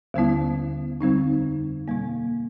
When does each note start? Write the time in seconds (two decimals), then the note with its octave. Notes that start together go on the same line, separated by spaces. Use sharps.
0.14 D#2 D3 G3 B3 E4
1.01 F2 D3 G3 C4 D#4
1.88 B2 G3 A#3